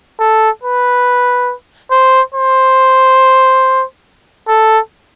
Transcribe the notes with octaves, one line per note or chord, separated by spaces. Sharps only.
A4
B4
C5
C5
A4